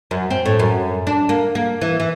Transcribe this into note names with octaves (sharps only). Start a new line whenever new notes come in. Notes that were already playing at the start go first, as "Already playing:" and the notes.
F#2
C4
A2
F#2
D4
A#3
A#3
E3
E3